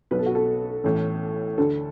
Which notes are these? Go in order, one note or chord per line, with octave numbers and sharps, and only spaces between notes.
B1 B2 B4
A4
F#4
A4
A1 A2 E3
D2 D3 A4